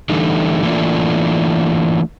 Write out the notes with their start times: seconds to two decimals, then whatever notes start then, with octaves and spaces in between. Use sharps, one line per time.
0.09 D3 E3 G3 A3 D#4
0.63 E3 A3 A#3 D4 F4